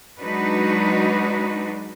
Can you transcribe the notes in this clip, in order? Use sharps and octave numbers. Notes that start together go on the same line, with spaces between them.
F#3 G#3 D4 D#4 F#4 B4